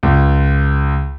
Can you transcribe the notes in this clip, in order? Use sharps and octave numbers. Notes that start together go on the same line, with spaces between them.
C#2